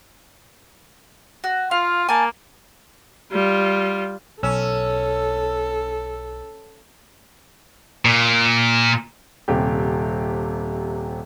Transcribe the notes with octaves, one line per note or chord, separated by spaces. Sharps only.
F#4
F4 F5
A#3 G#5 A5
G3 F4
B1 C#4 A4 E6
A#2
D#1 C3 G4